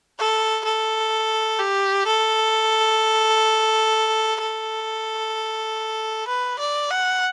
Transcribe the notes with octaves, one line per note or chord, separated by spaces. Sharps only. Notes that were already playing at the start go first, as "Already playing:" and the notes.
A4
A4
G4
A4
A4
B4
D5
F#5